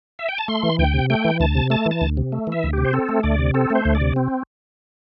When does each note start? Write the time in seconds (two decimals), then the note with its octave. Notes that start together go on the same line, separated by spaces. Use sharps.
0.19 E5
0.29 G5
0.38 A5
0.48 A3 C6
0.63 E3
0.79 D2 G5
0.94 C3
1.10 A3 G5
1.25 E3
1.40 D2 A5
1.55 C3
1.70 A3 A5
1.86 E3
1.91 A5
2.01 D2
2.17 C3
2.32 A3
2.47 E3
2.52 E5
2.63 D2
2.73 C3 G4
2.85 C5
2.93 C4 A4
3.09 A3
3.23 D2 D5
3.39 C3
3.54 C4 A4
3.70 A3 C5
3.85 D2
3.95 D5
4.01 C3
4.16 C4